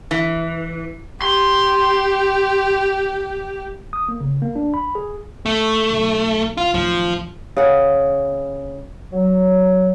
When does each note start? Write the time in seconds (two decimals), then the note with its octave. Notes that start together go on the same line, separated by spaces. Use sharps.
0.11 E3
1.22 G4 C6
3.93 D#6
4.09 A#3
4.21 C#3
4.42 A#3
4.56 D4
4.74 B5
4.95 G#4
5.46 A#2 A3
5.91 B1
6.57 F4
6.74 D1 D#3 F3
7.57 C#3 F#5
9.11 F#3